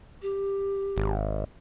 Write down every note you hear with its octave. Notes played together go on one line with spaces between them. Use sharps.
G4
G#1